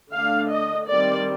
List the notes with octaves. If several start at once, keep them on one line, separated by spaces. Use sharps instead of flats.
D3 A3 D4 F5
D#5
D#3 G3 C4 D5